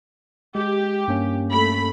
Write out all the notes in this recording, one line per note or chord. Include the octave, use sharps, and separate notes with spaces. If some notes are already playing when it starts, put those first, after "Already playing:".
G#3 G4
G2 A#3 C#4
A3 B5